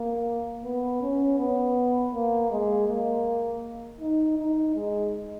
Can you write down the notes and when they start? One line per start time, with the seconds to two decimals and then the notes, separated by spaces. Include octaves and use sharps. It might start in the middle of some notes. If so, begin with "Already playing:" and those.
Already playing: A#3
0.64 B3
1.02 C#4
1.39 B3
2.13 A#3
2.51 G#3
2.88 A#3
4.00 D#4
4.38 D#4
4.75 G#3